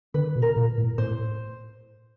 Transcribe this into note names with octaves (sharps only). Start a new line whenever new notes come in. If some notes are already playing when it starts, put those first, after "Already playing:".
D3 B4
B2
A#4
A#2
A2
A2 C5